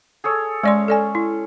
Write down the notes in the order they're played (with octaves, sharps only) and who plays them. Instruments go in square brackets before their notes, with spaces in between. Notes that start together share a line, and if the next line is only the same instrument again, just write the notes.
[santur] G#4 A4 C#5
[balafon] G#3 D5 C6 [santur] C#4
[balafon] A4 D5 G#5
E4